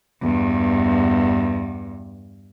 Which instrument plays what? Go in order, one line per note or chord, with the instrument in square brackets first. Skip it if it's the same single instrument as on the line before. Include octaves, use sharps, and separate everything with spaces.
[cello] E2 G2